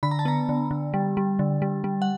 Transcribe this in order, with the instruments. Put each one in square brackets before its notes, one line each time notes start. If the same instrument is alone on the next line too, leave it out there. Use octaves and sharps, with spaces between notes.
[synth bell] D3 B5
A#5
A5
B3 A#5
D3
D3
G3
G3
D3
G3
G3
F#5